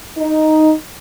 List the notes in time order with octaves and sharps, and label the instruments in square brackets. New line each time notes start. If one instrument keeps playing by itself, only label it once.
[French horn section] D#4